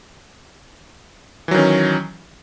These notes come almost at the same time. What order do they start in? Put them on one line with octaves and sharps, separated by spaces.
E3 F#3 D#3 C#4